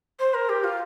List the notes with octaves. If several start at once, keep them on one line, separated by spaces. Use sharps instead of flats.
C5
A#4
G4
F4